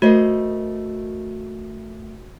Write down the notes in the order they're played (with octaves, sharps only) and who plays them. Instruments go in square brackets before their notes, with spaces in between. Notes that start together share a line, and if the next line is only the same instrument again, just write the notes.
[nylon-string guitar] A3 C5 D#5 [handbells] F#4 A#4